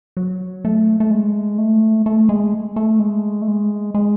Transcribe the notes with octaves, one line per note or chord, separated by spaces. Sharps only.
F#3
A3
A3
G#3
A3
A3
G#3
A3
G#3
A3
G#3
G#3